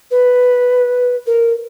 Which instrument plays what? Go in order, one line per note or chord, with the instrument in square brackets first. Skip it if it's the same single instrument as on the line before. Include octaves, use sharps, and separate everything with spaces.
[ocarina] B4
A#4